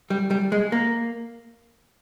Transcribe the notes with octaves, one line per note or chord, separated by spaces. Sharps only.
G3
G3
G#3
A#3